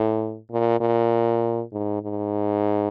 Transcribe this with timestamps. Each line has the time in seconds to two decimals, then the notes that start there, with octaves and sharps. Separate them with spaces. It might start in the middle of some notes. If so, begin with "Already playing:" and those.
Already playing: A2
0.51 A#2
0.80 A#2
1.72 G#2
2.02 G#2